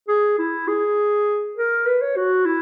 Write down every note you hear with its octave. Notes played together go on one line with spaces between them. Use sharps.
G#4
E4
G#4
A#4
B4
C#5
F#4
E4